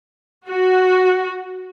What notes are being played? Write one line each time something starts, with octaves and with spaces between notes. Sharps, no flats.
F#4